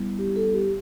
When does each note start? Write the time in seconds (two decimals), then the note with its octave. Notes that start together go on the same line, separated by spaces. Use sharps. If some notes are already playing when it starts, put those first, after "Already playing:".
Already playing: G3 B3 E4
0.18 G4
0.36 A4
0.53 G4